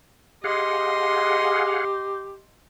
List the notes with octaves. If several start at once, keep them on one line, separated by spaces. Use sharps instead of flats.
G4 G#4 D#5 F5 F#5 C6